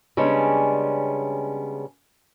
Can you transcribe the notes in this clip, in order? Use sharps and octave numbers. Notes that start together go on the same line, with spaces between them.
C#3 G3 G#3 B3 C#4 D4